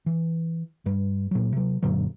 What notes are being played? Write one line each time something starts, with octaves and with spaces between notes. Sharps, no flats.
E3
G2 G3
A#2 F#3
C3 F#3
F#2 A#2 D3 F#3